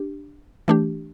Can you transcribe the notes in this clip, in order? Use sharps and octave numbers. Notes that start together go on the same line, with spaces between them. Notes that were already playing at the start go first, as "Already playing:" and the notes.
Already playing: D4 G4
E3 A3 D4 G4